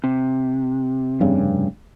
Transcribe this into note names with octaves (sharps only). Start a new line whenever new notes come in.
C3
F1 G2 C#3